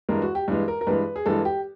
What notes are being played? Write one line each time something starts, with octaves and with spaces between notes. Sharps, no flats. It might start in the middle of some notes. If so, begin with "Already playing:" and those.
G2 E3 G#3 A#4
F#4
G4
G2 E3 G#3
A#4
A#4
G2 E3 G#3 B4
G#4
G2 E3 G#3 A4
G4